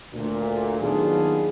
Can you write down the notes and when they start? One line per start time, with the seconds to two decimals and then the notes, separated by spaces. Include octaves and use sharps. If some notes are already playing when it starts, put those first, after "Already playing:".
0.13 D2 A#2
0.81 D#2 F#3 B3 D4 F4 G#4